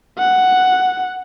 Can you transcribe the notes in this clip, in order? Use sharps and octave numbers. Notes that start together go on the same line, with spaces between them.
F#5